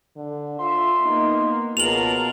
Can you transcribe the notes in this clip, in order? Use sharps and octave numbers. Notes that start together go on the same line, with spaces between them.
D3
F4 E5 C6
A#3 B3 D#4
C#2 B2 F4 A#4 A5 F7 F#7